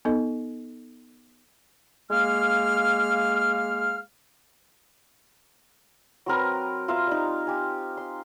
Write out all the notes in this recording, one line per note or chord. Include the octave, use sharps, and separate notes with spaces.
B3 D#4 A4 D#5
G#3 A#3 F5 F6
F#3 C4 A#4 B4
F4 E5 F5 A#5
G3 D#4
G4 G#5
C6